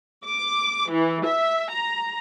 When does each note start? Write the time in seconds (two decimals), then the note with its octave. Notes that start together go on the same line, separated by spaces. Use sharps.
0.24 D6
0.91 E3
1.25 E5
1.71 A#5